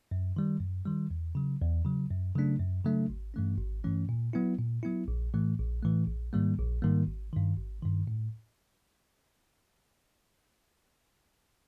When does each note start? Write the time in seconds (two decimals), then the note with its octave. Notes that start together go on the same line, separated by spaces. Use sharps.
0.11 F#2
0.36 D#3 G3
0.60 F#2
0.86 D#3 G3
1.11 E2
1.35 C#3 F#3
1.61 E2
1.85 C#3 F#3
2.11 F#2
2.35 C#3 F#3 A3 D4
2.60 F#2
2.84 C#3 F#3 A3 D4
3.10 G#1
3.34 G2 E3 A3 C#4
3.59 G#1
3.84 G2 E3 A3 C#4
4.09 A#2
4.33 F#3 B3 E4
4.58 A#2
4.83 F#3 B3 E4
5.08 A#1
5.34 A2 E3 A3
5.59 A#1
5.83 A2 E3 A3
6.07 A#1
6.33 G#2 D#3 G3 A#3
6.58 A#1
6.82 G#2 D#3 G3 A#3
7.07 G#1
7.33 G2 D#3
7.57 G#1
7.82 G2 D#3
8.07 A2